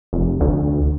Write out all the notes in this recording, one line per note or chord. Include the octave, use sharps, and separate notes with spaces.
F1
D2